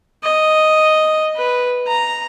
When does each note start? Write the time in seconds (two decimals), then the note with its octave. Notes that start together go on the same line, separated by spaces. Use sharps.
0.23 D#5
1.36 B4
1.87 A#5